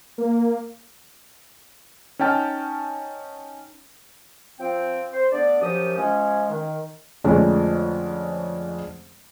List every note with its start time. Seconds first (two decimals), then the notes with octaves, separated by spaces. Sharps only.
0.18 A#3
2.19 C#4 D#4 G5 A5 F6
4.59 F3 C4 G5
5.13 C5
5.32 D3 A3 B3 D4 D5
5.62 F#2 F3 G4 D#6
5.96 F3 G#3 C#4
6.50 D#3
7.24 F2 D3 F3 G#3 A3 C#4